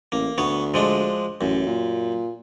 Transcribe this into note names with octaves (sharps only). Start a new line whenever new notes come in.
A1 A#3
D2 B3 C#5
F3 G#3 D4
A1 F#2
A#2